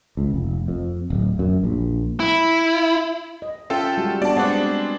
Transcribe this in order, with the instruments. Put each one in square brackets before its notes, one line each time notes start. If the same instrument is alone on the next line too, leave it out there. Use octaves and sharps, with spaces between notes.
[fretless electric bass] C#2
F1
F2
D1
F#2
A#1
[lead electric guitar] E4
[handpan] D#5
[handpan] C#4 E5 [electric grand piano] F4 A4 G5
[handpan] G3 G#3 F#4
[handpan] B3 D4 F#4 [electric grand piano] D5 A5
[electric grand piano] G#3 C4 D4 [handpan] D5 F#5